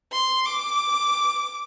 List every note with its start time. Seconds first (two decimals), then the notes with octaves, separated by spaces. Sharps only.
0.12 C6
0.45 D6